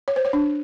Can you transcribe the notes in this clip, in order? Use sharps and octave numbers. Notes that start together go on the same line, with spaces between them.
C#5
C5
C#5
D4